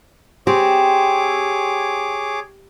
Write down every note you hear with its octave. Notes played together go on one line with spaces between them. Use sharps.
C4 G4 G#4 C#5 D6